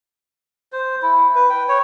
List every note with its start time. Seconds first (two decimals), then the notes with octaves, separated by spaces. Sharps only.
0.73 C5
1.02 E4
1.35 B4
1.50 G5
1.69 C#5